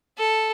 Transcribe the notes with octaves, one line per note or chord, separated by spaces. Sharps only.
A4